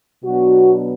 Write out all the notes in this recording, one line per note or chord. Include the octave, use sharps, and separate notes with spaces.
B2 F#3 B3 D4 F#4